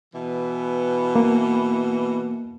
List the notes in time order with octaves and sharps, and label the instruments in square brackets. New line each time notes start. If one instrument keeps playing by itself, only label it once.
[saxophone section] B2 E3
[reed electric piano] A#3